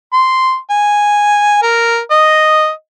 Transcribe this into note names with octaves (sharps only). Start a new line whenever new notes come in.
C6
G#5
A#4
D#5